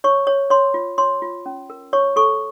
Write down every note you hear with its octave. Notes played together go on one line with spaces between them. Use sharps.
C#5 C#6
C#5
C#5 C6
F4
C#5 C6
F4
C#4
A#4
C#5 C#6
A4 C#6